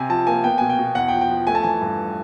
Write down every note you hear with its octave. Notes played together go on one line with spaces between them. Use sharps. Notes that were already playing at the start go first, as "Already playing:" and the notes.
Already playing: C3 G#5
F3 A5
A#3 G#5
B3 G5
B2 G#5
G5
B2
E2 F#5
F3 G5
G5
F3
A3 G#5
A5
E3 G#5
G2